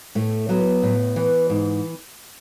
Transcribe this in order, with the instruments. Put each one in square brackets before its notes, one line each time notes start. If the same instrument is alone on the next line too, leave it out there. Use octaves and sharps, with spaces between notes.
[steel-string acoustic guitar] A2 A3
F#3 B3
A2
E3
G#2